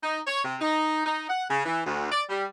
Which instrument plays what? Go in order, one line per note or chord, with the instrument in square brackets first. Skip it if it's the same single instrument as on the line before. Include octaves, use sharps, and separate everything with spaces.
[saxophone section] D#4
C#5
C3
D#4
D#4
F#5
C#3
E3
D2
D5
G3